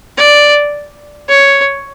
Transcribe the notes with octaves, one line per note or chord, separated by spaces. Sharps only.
D5
C#5